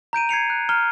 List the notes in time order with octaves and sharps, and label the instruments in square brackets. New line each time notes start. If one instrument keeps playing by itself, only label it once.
[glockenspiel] A#5 G6 D7 D#7
G#6 C7 C#7 F7
F#6
A#5 F6 G7